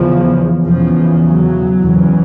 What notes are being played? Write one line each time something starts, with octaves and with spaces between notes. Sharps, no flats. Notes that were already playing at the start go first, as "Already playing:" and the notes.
Already playing: E2 C#3 F3
E2 C#3 F3
F#3
E2 C#3